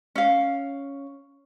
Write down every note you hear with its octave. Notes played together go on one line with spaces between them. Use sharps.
C#4 F5